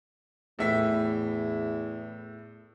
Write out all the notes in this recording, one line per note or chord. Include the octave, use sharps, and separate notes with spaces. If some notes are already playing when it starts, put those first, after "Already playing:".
E2 A2 E5 B6